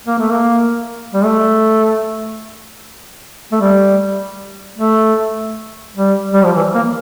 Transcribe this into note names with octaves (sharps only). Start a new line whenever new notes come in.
A#3
A3
A#3
G3
A3
A3
G3
A3
G3
G3
F3
E3
A#3